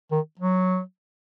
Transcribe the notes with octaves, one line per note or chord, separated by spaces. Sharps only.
D#3
F#3